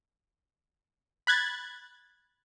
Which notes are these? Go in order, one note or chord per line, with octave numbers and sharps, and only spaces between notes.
B5 F#6 G#6 A6